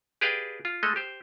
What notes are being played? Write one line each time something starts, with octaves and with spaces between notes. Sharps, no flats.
G4 G#4 B4 D5 F5 G5
F4
G#3 A3 A4 D#5
G4 C5